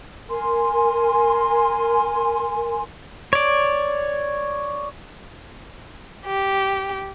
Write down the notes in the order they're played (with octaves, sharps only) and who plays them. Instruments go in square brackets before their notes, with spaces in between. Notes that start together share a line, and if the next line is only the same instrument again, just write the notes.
[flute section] A#4 G#5 C6
[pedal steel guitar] C#5 D5
[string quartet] G4